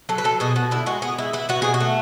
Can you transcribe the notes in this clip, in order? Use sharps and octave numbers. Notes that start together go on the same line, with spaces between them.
F#3 A4
B4
F#3 A4
B2 G#4
B2 F#4
D3 E4
G#3 F#4
B3 G#4
G#3 E4
B3 E4
B3 F#4
B2 G#4
F#4
A3